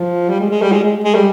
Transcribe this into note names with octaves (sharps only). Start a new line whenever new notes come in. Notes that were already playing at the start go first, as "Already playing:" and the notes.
Already playing: F3
G3
G#3
G#3
G3
G#3
G#3
G#3
G3